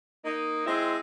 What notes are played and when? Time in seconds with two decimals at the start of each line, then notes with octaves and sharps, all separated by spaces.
0.25 A#3 D#4
0.66 G#3 C4 E4